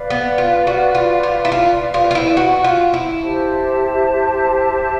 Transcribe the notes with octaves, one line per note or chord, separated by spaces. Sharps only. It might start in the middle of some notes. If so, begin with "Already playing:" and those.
Already playing: B4 D5 F5
B3
F4
F#4
F4
F4
E4
F4
F4
F4
E4
F#4
F4
E4
G4 C5 E5 A5